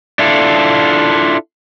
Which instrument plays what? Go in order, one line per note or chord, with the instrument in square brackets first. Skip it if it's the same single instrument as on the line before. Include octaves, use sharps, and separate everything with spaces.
[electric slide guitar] D4 E4 F4 A4